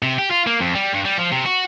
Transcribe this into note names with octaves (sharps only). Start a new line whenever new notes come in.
C3
G4
F4
A#3
F2
G3
G2
G3
F3
C3
F#4